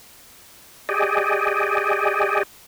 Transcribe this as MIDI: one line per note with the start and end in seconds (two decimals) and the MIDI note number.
0.89 2.43 67
0.89 2.43 68
0.89 2.43 74
0.89 2.43 75